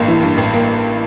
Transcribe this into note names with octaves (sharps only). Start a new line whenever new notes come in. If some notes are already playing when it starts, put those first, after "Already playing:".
Already playing: A1 G2 A#3
E3
G2
A1
A#3